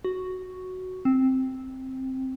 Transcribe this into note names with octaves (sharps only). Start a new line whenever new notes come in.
F#4
C4